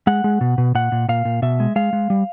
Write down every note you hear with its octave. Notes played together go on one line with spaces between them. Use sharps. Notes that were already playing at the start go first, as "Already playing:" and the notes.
G#3 F#5
G#3
B2
B2
A#2 F#5
A#2
A#2 F5
A#2
B2 E5
G#3
G#3 F5
G#3
G3